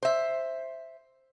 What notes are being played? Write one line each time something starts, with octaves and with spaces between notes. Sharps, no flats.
C5 E5